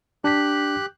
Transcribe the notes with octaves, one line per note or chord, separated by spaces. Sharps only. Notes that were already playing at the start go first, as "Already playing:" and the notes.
D4 G4 F#6 B6